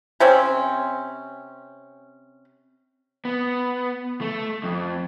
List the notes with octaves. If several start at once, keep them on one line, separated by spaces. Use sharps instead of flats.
C3 C4 C#4
B3
A3
F2